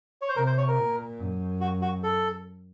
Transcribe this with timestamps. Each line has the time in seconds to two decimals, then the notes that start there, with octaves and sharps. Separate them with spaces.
0.21 C#5
0.29 C5
0.36 C3 A#4
0.46 C5
0.58 C#5
0.68 A#4
0.78 A#2
1.19 F#2
1.61 F#4
1.82 F#4
2.03 A4